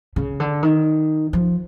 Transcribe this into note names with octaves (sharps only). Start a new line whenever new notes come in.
C#3
D3
D#3
F3